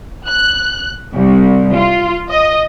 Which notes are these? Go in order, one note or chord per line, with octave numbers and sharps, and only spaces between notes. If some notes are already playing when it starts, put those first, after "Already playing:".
F#6
C2
F4
D#5